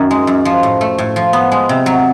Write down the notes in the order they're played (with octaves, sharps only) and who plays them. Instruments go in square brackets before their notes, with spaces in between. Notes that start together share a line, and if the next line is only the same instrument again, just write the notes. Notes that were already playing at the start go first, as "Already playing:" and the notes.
Already playing: [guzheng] F#2 D#3
G#3
F#2
F3
A2
A3
A2
F3
B3
G#3
C3
F#3